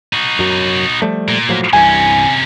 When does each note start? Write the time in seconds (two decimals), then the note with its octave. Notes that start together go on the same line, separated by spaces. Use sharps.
0.13 D#4 F#4
0.39 F#2 F#3
1.02 F3 G3 A3
1.28 A#2
1.49 A2 F3 F#3
1.73 C2 G2 C3 E3 C#4 G#5